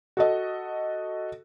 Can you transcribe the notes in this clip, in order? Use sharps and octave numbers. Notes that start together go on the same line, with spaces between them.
F#4 A4 D#5